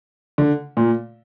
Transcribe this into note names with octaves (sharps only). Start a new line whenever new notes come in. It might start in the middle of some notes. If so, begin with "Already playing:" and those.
D3
A#2